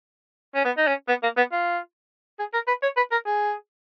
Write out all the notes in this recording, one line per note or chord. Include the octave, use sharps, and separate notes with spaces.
C#4
B3
D#4
C#4
B3
A#3
B3
F4
G#4
A#4
B4
C#5
B4
A#4
G#4